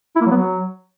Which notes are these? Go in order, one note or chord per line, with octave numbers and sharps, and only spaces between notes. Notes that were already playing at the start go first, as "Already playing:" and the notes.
E4
A#3
F#3
B3
F#3